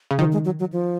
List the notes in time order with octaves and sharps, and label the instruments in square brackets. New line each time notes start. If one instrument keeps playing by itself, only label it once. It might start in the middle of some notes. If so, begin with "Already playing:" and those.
[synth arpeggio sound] C#3
[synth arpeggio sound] D#3 [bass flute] F3
[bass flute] G#3
F#3
F#3
F3